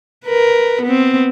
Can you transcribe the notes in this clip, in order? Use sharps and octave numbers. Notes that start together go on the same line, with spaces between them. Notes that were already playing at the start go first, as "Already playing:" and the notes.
A#4 B4
B3 C4